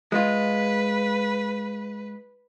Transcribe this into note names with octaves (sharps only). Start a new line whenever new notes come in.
G#3 F4 B4